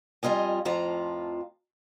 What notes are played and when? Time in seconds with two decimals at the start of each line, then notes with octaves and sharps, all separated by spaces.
0.23 F2 G3 F4 D#5 G#5
0.65 F2 A2 F3 F4 A#5